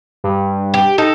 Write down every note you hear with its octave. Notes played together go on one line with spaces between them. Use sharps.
G2
G4
D#4 A4